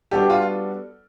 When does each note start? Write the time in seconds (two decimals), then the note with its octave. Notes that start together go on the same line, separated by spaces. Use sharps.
0.11 G3 B3 D4 F#4 G4 A4
0.30 F4